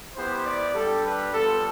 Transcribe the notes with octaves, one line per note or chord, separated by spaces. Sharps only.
B3 E4 G4 C5
D5
G3 D4 G4 A4
B4
G3 B3 F4 A4